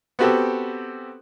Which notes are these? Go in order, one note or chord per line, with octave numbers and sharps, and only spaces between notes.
B3 C4 F#4 G4 A4